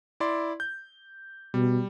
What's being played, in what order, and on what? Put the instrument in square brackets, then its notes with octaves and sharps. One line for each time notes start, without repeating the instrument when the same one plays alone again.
[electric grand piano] E4 D5 C6
G6
[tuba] B2 [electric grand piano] G3